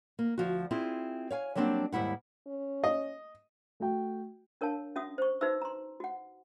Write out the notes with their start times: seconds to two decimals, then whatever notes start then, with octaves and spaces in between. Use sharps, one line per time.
0.19 A#3
0.38 D2 F3 F#4
0.71 C4 E4 F4 G#4
1.30 C#5 F5 G#5
1.55 F#3 G3 A#3 C4 D4 G4
1.92 D#2 G#2 G3 E4 F#5
2.47 C#4
2.84 D#5
3.80 A3 F#4 G5
4.61 D4 A#4 C#5 F5 A5
4.96 C#4 F#4 E5 D#6
5.18 C5 C#6
5.41 D#4 F#4 B4 C5 E5 E6
5.62 A#5 C6
6.00 F#4 F#5